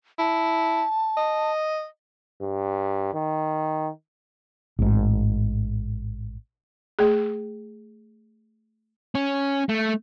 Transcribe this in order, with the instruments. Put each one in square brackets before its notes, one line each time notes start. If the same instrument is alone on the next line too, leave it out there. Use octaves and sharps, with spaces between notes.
[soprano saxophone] E4 [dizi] A5
[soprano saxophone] D#5
[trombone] G2
D#3
[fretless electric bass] A1 G#2
[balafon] A3 G#4
[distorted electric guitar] C#4
A3